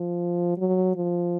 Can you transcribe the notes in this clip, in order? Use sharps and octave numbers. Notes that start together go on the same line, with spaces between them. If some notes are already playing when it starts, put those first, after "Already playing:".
Already playing: F3
F#3
F3